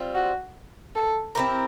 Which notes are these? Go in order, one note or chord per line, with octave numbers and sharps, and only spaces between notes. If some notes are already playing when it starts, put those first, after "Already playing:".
Already playing: G3 C4 F4
F#4
A4
C4 E4 G4 A#4